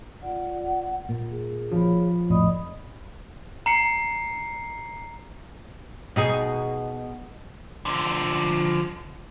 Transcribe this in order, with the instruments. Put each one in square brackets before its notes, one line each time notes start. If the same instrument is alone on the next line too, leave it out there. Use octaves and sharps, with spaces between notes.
[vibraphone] F4 D5 [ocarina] F#5
[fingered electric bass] A#2 [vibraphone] A#4
[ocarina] G#4
[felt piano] F3 [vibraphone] C#5 F5 B5
[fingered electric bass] A#1 F2 A2 [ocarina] D5 [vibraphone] D#5 B5 D#6
[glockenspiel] A#5 C7 C#7
[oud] B2 D#4 G#4
[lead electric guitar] D3 F3